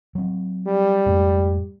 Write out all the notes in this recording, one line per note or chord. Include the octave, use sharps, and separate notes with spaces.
F#3 C4
G3
F2 G#2 A3